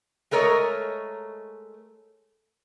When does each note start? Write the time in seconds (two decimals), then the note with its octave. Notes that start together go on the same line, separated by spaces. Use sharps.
0.31 G#3 A3 A#4 C#5 D#5